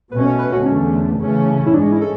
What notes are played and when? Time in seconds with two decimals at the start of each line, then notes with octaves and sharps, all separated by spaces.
0.12 B2 A3 C#4 B4
0.25 C#5
0.39 B4
0.52 F#4
0.66 E2 D3 A3 C#4
1.20 C#3 E3 A3 C#4
1.66 E4
1.74 G#2 G#3 C#4 D4
1.87 D4
1.92 E4
2.01 A4